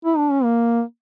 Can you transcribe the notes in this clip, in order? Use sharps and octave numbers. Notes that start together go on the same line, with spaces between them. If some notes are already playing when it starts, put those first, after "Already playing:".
E4
D4
C#4
A#3